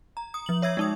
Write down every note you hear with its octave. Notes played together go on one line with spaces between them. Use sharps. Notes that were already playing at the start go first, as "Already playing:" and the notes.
A#5
D#6
F3 F#7
C#5 E5 E6 G#6
G#3 D#4 D#6